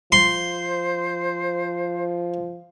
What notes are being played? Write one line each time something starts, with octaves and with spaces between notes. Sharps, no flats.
F3 C5 C6